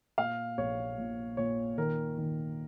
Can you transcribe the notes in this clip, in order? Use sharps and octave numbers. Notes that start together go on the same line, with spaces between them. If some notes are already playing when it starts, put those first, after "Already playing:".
A#2 F5
A#1 C#5
A#2
A#2 C#5
D#3 A#4
D#3